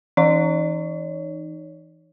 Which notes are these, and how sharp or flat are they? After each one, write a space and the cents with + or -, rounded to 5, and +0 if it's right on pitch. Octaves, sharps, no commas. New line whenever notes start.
E3 +0 D#4 -15 C#5 +5